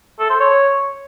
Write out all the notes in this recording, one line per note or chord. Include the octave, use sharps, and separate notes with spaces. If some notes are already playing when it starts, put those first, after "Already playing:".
A4
C5
C#5